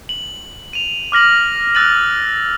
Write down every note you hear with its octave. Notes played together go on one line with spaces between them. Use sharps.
F#7
D#7 F7
D6 F6 A#6 F#7
E6 F#6 A6 D#7 F#7